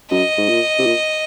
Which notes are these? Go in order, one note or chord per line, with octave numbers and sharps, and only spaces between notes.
F#2 D#5
G#2
A#2
C3
A#2